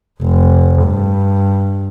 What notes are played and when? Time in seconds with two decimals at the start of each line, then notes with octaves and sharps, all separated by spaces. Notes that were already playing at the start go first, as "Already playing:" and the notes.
0.22 F1
0.84 G2